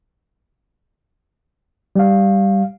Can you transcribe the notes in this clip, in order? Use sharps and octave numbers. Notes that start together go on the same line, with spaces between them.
G3 F5